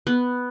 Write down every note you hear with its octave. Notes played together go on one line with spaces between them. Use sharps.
B3